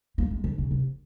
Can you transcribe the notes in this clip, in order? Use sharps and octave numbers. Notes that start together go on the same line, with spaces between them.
A#3
G#3
D3
C#3
C3